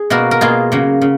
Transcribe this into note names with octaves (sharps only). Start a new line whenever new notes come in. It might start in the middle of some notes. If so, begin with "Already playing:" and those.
Already playing: G#4
B2 A#3 F#4 A#4
A#4
B2 A#3 F4 G#4
C#3 F#3 A#3
C#3